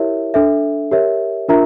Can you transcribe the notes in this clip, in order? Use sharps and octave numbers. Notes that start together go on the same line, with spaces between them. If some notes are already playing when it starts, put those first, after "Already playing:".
Already playing: E4 G4 A#4 C#5 E5
D4 A4 E5
G4 A#4 C#5 E5
D4 F4 A#4 E5 A#5